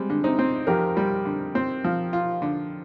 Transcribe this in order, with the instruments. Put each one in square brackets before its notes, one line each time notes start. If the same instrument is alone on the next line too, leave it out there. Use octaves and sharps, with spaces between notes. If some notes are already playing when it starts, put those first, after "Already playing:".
Already playing: [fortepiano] G3 [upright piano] G#3 C4
[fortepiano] D3
[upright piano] C4 D#4
[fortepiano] C4
[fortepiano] F2 [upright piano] G4 A#4
[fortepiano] G3
D3
C4
F3
F4
D3